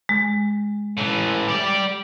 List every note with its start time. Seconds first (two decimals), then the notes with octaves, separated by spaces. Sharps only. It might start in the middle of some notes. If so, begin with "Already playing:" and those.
0.09 G#3
0.97 A2 E3
1.48 G4 D5